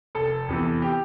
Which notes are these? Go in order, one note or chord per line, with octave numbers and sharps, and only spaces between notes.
F1 A4
E2 C3 E3
G4